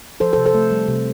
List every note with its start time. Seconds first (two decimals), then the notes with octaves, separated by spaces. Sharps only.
0.20 F3 A4 C5
0.33 A4 C5
0.38 C3
0.46 A4 C5
0.54 A3
0.71 G3
0.88 C3